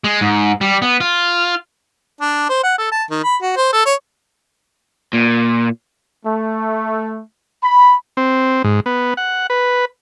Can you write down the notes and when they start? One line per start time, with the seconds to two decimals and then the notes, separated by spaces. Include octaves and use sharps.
0.04 G#3
0.21 G#2
0.61 G3
0.82 B3
1.01 F4
2.21 D4
2.49 C5
2.63 F#5
2.78 A4
2.92 A5
3.10 D#3
3.24 B5
3.42 F#4
3.56 C5
3.73 A4
3.86 C#5
5.14 A#2
6.26 A3
7.63 B5
8.17 C4
8.64 G#2
8.86 B3
9.17 F#5
9.50 B4